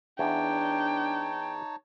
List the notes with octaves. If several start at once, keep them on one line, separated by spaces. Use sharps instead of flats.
E2 D4 D#4 C#5 G5 A5